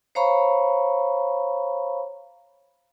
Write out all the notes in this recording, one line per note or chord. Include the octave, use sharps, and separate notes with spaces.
C5 C#5 F5 A#5 B5 C#6